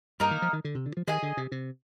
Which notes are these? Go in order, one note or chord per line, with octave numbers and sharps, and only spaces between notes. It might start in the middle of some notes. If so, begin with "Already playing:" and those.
G2 A#3 D#4 A#4
D#3
F3
D#3
D3
C3
D3
F3
D#3 G#4 D#5 G#5
D3
C3
C3